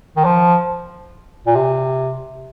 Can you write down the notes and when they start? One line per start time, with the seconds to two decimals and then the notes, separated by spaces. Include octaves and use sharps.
0.16 D#3
0.24 F3
1.46 A#2
1.55 C3